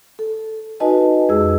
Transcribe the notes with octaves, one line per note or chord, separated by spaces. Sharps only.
A4
D#4 F#4 B4 D#5 G#5 A5
F2 G#3 G#4 E6